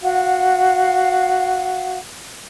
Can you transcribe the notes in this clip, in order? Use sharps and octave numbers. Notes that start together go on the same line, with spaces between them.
F#4 F5 F#5